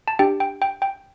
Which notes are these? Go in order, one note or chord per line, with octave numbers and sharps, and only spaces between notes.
A5
D4 G4 G5
G5
G5
G5